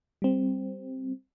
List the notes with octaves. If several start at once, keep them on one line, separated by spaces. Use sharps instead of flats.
G3 C4